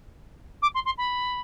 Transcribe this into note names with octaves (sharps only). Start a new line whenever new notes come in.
D6
C6
C6
B5